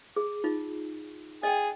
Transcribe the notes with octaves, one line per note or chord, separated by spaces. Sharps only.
G#4
D#4 F4
G#4 D#5 G5